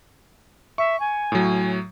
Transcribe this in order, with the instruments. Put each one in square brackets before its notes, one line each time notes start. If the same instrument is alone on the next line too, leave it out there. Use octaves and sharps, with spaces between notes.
[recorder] E5 [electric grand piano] C#6
[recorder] G#5
[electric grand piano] A2 F#3